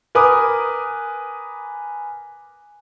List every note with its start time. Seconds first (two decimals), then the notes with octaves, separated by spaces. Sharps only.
0.15 A#4 B4 G#5 D6 D#6